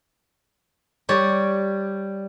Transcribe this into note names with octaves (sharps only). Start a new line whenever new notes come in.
G3 C#5 D5